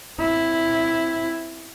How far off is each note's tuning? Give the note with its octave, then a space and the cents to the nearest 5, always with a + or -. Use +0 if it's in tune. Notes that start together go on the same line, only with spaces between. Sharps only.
C4 +0 E4 +0